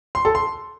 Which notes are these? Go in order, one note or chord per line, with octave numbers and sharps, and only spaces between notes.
C6
A4
C6